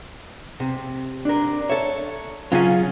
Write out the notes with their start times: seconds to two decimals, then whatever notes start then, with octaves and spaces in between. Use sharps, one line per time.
0.60 C3
1.25 D4 A#4
1.70 A4 C#5 E5
2.52 C#3 F#3 C#4 F4 G#5